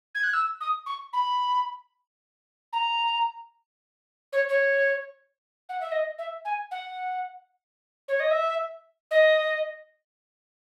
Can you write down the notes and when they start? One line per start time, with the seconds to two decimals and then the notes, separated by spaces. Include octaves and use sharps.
0.15 G#6
0.23 F#6
0.33 E6
0.60 D#6
0.86 C#6
1.13 B5
2.72 A#5
4.32 C#5
4.49 C#5
5.69 F#5
5.80 E5
5.91 D#5
6.18 E5
6.45 G#5
6.71 F#5
8.08 C#5
8.20 D#5
8.31 E5
9.11 D#5